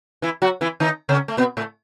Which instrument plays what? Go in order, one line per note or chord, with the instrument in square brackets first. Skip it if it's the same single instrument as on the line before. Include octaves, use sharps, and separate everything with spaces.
[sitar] E3 E4
F#3 F#4
E3 E4
D#3 D#4
C#3 C#4
A3
B2 B3
A2 A3